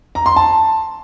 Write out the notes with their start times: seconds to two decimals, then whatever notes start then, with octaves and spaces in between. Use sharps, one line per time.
0.15 A#5
0.26 C6
0.36 A5